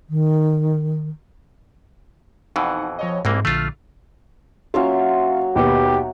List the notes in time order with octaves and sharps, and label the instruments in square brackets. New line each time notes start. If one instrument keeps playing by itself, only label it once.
[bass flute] D#3
[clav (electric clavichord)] F2 B2 E3 [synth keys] D#4 F#5
[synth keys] F3 C#5 D#5
[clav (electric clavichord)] C2 E3 A#3 [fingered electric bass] G#2 [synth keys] G#3 C4
[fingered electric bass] A#1 D3 [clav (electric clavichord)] A3 F4 [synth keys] F6
[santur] F#3 A#3 E5 [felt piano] C#4 F4
[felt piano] D#2 B2 B3 [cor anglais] G4